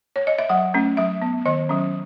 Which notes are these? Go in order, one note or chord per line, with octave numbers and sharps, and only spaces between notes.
C#5
D#5
E5
F#3 F#5
A3 C#4
F#3 E5
B3
D#3 D#5
F#3 C#4